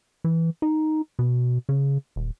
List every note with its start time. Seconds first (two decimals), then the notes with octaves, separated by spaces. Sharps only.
0.24 E3
0.62 D#4
1.19 B2
1.69 C#3
2.16 D#1